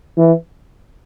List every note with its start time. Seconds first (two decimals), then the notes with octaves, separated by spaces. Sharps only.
0.17 E3